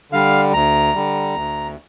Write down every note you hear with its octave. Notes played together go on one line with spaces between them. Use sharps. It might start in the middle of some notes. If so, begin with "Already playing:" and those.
D3 G3 F5
D2 A#5
D3 G3
D2